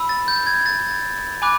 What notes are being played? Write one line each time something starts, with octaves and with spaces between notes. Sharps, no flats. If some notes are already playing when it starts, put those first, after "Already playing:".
Already playing: B5 E6
A6
G6
G#6
A6
G#5 B5 D6 F#6